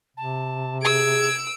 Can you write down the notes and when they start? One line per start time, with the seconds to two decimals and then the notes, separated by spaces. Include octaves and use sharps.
0.17 C3 A5
0.82 G#4 E6 G#6 D7